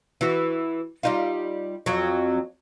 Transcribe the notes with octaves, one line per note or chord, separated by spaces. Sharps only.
E3 F#4
G3 D#4 F4
F2 F#3